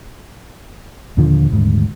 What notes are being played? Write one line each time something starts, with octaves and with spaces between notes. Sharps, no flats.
D#2 A#2 D3 F3
D#1 D2 G#2